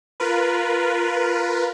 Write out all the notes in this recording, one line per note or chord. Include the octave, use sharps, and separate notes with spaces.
F4 A#4 B4